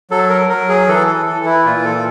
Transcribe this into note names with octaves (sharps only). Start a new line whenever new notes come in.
F#3 A4
A#4
F#3 A#4
G#4
E3 A4
A4
E3 A4
E4
A#2 F4
A4